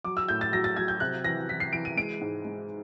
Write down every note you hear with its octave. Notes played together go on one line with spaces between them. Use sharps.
F#3 D6
E6
A2 G6
A6
F#3 A#6
A6
F#3 G#6
G6
C3 F#6
E3 A#6
E3 B6
C7
E3 D7
D#7
G#3 D7
G#2
G#3